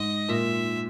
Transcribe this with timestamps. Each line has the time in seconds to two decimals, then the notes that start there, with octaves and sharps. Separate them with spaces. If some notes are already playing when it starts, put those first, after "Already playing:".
Already playing: G#2 D#5
0.29 A#2 E5